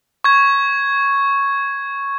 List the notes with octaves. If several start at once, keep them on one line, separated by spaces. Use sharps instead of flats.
C#6 G#6